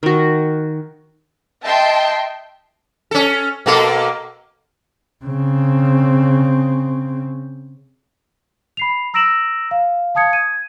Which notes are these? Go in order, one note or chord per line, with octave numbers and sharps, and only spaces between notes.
D#3 F#4
D#5 E5 G5 A5 C6
C#4 A4
B2 A#3 A4
C#3 C4
B5 C7 F7
A#5 E6 A#6 D7 E7 F#7
F5
F5 A5 D#6 G#6 C#7
G#6 D#7